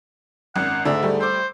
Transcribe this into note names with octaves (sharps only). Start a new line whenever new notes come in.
G#1 F#2 F#5
D2 G#2 D3 D4 E5 A#5
G3 A3
C5 D6 E6